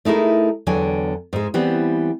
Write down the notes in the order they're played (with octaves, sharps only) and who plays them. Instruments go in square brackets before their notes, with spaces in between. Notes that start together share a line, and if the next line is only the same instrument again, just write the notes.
[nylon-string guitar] A3 D#4 E4 G#4 A#4
E2 D3 F#3 G5 G#5
G#2 G#3
E3 G3 B3 C4